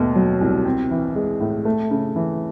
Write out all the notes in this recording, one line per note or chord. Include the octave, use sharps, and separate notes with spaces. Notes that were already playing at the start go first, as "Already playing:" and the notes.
Already playing: D#2 B2 A3
F#3
C2
C4
E3
G#3
A2
A3
C#3
E3